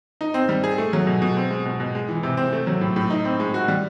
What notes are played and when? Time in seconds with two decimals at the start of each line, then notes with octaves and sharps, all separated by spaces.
0.21 D#4
0.34 C4
0.49 G3
0.64 G#4
0.78 A3
0.93 F#3
1.07 B2
1.22 B2
1.37 C4
1.51 G#3
1.66 B2
1.80 B2
1.95 G#3
2.09 E3
2.23 C3
2.37 C4
2.53 A3
2.67 F#3
2.81 A2
2.96 A2
3.10 D#4
3.25 C4
3.40 G#3
3.54 F#4
3.68 G3